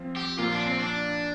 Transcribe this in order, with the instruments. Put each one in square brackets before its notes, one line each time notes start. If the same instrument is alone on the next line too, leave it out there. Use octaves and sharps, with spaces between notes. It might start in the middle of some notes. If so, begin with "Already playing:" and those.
Already playing: [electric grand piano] F3 C4 F4
[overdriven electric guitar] G4
[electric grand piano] A#2 F3 A#3 [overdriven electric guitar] F4
[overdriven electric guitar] D4
C4
D4